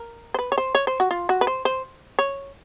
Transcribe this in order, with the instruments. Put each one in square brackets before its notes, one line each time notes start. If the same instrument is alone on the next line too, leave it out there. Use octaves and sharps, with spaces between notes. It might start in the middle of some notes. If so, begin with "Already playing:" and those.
Already playing: [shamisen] A#4
C5
B4
C#5
C5
C#5
C5
F#4
F4
F#4
B4
C5
C5
C#5